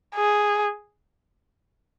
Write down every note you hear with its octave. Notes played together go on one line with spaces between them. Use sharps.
G#4